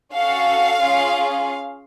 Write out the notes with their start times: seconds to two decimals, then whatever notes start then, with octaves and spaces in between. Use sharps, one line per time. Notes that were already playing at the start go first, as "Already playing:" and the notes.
0.12 C#4 F#4 A4 F5
0.80 C#4 F4 G#4